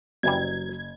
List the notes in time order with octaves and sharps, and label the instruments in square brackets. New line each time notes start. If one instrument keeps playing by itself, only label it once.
[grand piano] F#1 [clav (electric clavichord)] C3 E3 G3 [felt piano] F#3 [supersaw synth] G#6